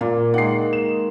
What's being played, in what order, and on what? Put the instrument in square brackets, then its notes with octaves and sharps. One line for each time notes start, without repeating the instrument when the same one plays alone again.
[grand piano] A#2 [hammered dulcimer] A#3
[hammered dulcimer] D#3 G#3 [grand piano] F#5 C7
[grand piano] E7